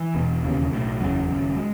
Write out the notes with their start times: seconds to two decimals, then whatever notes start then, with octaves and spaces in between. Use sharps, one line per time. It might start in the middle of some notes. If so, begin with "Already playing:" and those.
Already playing: E3
0.15 E1 E2 B2
0.43 E1 D#2 C#3
0.71 B1 A2
1.00 F#1 E2 C#3 F#3
1.28 G#1 F#2 C#3
1.56 G#3